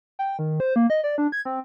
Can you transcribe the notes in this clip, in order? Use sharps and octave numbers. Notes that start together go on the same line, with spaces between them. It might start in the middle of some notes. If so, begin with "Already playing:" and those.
G5
D#3
C5
A#3
D#5
D5
D4
G#6
C4